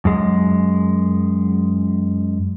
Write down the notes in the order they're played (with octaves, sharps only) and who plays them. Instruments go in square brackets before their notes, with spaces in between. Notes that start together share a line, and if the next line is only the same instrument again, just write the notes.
[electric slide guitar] F#2 G#3